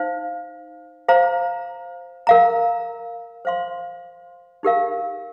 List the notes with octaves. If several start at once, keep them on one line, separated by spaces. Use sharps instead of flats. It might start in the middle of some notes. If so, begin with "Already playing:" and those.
Already playing: D#4 C5 F5
C5 F5 A#5
A#4 F5 A#5
C5 F5 C6
D#4 G4 A#4 F5